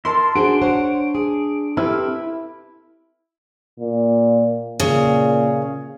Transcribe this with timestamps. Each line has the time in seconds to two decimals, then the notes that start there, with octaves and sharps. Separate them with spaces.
0.05 E4 A#4 A5 C6
0.36 D4 F#4 G#4 C5 C6 D7
0.62 C5 C#5 F#5
1.15 G#4
1.77 C4 E4 G4 A4 B4 F6
3.80 A#2
4.80 A#2 C#3